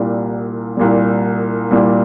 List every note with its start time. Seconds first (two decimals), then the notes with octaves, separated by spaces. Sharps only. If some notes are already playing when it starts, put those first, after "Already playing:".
Already playing: C2 A#2 G3
0.77 C2 A#2 G3
1.71 C2 A#2 G3